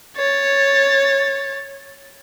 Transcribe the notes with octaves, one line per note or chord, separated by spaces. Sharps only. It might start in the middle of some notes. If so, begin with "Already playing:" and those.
C#5 A6